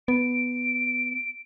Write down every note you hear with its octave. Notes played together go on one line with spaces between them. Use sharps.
B3 D7